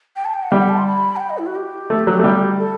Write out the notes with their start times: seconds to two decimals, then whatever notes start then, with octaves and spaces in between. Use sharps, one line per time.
0.16 G5
0.25 A5
0.34 G5
0.43 F#5
0.51 G3 E5
0.59 F#5
0.69 A5
0.78 C6
0.86 B5
1.16 F#5
1.20 G5
1.30 D#5
1.38 E4
1.46 F#4
1.55 G4
1.90 A3
2.07 F#3
2.19 A3
2.24 G3
2.59 A4